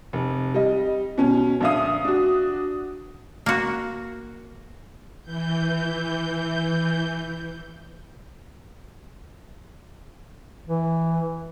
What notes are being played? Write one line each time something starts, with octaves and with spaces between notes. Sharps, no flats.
F1
G3 D#5
B2 C#4
A#1 D3 E5 F5 D#6
D4 F#4
A#3 F#4
E3 G6
E3